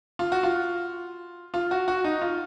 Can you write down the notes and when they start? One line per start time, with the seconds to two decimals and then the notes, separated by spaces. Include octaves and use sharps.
0.19 F4
0.32 F#4
0.43 F4
1.54 F4
1.71 F#4
1.88 F#4
2.04 D#4
2.22 F4